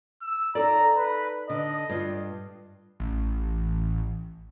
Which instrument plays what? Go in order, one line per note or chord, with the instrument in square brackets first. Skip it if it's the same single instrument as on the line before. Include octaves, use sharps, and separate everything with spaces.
[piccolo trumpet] E6
[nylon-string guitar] D#4 A4 D5 [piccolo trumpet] A#5
[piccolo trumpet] B4
[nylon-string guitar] D3 [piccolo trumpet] D#5
[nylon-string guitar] G2 F4
[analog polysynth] A1